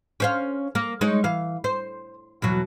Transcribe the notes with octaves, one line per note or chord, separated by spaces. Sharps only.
C#4 C5 F5
A#3
G#3 D#4 C#5
E3 F5
C5
E2 B2 F#3